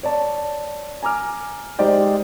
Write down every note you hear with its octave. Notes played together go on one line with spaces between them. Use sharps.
C#5 D5 A5
G#5 A#5 D6 F6
G#3 D#4 G4 C5 D5 G5